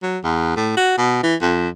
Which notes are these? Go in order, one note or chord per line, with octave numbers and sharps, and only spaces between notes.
F#3
E2
A2
F#4
B2
E3
F2